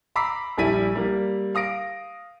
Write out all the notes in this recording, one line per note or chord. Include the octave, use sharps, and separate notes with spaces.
A#5 B5 D6 E6 B6 C7
A#1 G3 E4 B6 D#7
G3 A#3
F5 D#6 A#6 D7